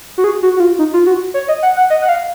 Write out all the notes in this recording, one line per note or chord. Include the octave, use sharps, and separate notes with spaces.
F#4
G#4
F#4
F#4
F4
D#4
F4
F#4
C#5
D#5
F#5
F#5
D#5
F#5
F5